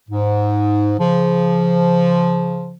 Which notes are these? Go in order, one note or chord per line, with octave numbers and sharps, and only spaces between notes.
G#2
C#3 F3